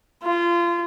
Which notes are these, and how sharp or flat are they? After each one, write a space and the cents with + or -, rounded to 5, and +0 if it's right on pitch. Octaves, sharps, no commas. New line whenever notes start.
F4 -25